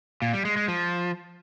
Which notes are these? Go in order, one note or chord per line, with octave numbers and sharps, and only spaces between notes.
A#2
G3
G#3
G#3
F3